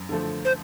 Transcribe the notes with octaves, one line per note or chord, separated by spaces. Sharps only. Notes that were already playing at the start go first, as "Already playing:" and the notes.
Already playing: F#2
D3 F3 A3
C5